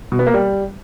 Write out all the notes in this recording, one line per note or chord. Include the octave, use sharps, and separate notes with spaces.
B2
B3
A#3
G3